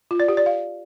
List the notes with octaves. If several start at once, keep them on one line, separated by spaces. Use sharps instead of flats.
F4
D5
G4
D5
F5